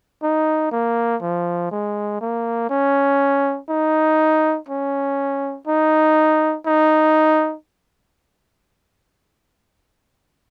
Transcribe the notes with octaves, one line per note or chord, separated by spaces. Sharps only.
D#4
A#3
F3
G#3
A#3
C#4
D#4
C#4
D#4
D#4